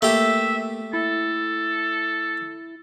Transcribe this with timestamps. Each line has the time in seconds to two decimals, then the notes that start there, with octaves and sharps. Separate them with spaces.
0.02 A3 A#3 G4 E5
0.93 E4 A4